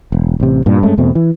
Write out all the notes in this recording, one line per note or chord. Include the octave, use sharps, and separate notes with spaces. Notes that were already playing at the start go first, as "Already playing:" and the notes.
E1
A1 C3
G2 A#2
G2 G#3 A3 C#4
E2 B2 A3 C4
E3